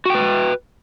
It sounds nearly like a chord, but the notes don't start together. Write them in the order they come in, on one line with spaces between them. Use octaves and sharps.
F#4 G5 B4